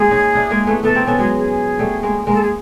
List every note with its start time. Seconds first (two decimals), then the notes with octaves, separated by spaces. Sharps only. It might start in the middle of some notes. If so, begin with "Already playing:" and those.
Already playing: G#3 A#3 G#4
0.11 C#4 D#4
0.35 D4 E4
0.51 G#3 A#3
0.67 A3 B3
0.83 A3 B3 A4
0.95 A#3 C4
1.06 B3 C#4 A4
1.17 F#3 G#3 G#4
1.37 G#4
1.79 G3 A3
2.03 G#3 A#3
2.27 G#3 A#3 A#4
2.34 A4
2.42 G#4